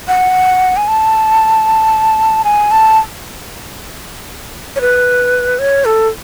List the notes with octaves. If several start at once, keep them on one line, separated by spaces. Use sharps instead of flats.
F#5
G#5
A5
G#5
A5
C#5
B4
C#5
A4